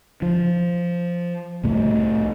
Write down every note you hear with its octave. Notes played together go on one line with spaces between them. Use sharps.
F3
C2 A2 A3